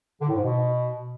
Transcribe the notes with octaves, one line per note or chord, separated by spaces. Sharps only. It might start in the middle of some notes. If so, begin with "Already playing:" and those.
D3
A2
G#2
B2